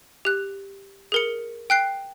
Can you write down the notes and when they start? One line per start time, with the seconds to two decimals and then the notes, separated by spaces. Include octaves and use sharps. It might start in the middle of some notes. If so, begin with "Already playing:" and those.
0.25 G4 F#6
1.12 G#4 A#4 C#7
1.70 G5 F#6 C7